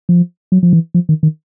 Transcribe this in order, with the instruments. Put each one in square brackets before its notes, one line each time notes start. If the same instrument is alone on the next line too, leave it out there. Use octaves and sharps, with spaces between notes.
[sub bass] F3
F#3
F3
E3
F3
D#3
D#3